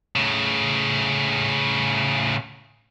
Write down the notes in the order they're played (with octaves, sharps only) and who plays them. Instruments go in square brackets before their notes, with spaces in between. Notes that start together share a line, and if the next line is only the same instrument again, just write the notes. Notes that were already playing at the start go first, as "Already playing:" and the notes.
[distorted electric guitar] A2 C#3